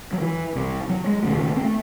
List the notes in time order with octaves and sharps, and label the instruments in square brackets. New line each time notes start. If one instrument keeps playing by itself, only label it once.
[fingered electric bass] F#3
E3
C2 C3
F#3
G#3
E1 D#2 C#3 A3
C4
A3